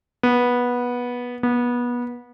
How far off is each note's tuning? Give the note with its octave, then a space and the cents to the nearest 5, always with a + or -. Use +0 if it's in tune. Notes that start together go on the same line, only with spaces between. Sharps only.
B3 -15
B3 -25